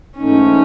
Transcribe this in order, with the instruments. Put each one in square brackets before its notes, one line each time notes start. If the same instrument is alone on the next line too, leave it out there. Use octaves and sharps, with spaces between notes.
[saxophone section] G#2 E3 A3 D#4 [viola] C#4